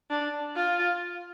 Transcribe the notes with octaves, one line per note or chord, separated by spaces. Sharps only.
D4
F4